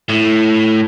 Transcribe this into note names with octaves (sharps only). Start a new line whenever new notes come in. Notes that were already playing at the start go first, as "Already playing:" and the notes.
A2